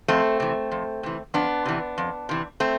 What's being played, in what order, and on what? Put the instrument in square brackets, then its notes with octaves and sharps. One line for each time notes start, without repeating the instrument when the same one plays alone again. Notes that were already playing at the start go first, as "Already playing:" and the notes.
[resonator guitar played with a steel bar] F2 A3 C4
C3 E3
F2
C3 E3
F2 B3 D4
C3 E3
F2
C3 E3
A3 C4